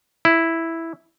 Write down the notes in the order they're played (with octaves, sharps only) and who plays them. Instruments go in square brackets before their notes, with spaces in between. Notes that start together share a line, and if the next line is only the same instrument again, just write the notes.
[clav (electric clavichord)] E4